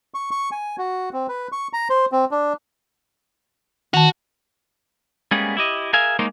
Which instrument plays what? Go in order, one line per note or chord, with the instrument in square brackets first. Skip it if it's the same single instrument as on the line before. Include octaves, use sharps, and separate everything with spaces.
[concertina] C#6
C#6
G#5
F#4
C4
B4
C#6
A#5
C5
C4
D4
[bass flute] D#3 [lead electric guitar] F#4 [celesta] A5 F7
[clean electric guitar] G3 G#3 A#3 B3 C#4 G#4
E4 G4 D#5
G#4 A#4 E5 F5 G#5
G#3 A#3 D#4 A#4 C5 C#5